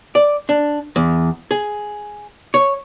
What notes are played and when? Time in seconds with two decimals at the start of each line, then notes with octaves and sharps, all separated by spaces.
0.15 D5
0.49 D4
0.96 E2
1.51 G#4
2.54 C#5